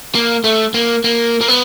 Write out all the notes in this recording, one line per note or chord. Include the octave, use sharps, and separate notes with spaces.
A#3
A3
A#3
A#3
A#3
B3